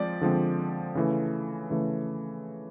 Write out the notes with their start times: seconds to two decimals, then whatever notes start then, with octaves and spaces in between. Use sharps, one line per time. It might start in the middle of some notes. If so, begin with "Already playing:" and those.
Already playing: F3 G#3 C4 D5
0.21 D3 F3 G#3 C4
0.95 C#3 E3 A3
1.70 C#3 E3 A3